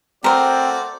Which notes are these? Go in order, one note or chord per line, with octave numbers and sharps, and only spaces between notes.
A3 C4 F#4 A#4 C5 D5